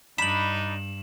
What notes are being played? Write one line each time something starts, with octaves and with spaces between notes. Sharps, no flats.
G2 D4 D#4 B5 E7 F#7